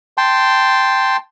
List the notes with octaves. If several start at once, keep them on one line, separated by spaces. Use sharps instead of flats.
G5 A5 C6